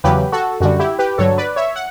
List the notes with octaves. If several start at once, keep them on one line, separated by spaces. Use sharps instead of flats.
E2 C#3 F#3 G4 B4
F#4 A4
F#2 D3 G3 F#4
E4 G4
G4 B4
G2 D3 F#3 A4 C#5
B4 D5
C#5 E5
F#5